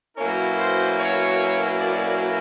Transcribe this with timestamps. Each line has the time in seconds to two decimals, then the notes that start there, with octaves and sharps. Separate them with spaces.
0.17 B2 F#3 A#3 C#4 E4 A#4
0.58 C5
0.99 C#5
1.81 D5